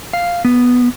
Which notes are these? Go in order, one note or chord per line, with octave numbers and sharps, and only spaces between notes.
F5
B3